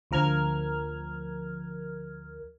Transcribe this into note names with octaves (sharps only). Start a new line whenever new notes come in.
D2 F3 A#4 F6 G#6